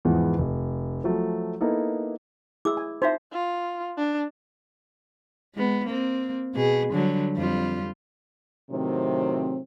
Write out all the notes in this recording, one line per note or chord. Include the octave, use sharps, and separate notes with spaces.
E2 G#2 E3 F3 G#3 B3
F1
F3 F#3 A3
A#3 B3 D#4 E4 A4
E4 G#4 D6 E6
G#5
D#4 F4 C5 E5
F4
D4
G#3 B3
A#3 C4
B2 G#4
D3 F#3 G3
F2 G3 F4
A2 C3 D#3 F#3 C4